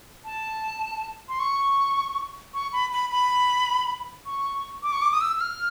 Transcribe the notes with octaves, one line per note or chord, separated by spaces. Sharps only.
A5
C6
C#6
C#6
B5
B5
B5
C#6
D6
C#6
D6
D#6
E6
E6
F6